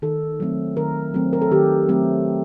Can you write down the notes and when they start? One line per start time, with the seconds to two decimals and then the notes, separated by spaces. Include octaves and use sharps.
0.02 D#3 A4
0.40 F#3 A3 C4
0.77 D#3 A#4
1.14 F#3 A3 C4
1.33 A#4
1.42 A4
1.51 D#3 G4
1.89 F#3 A3 C4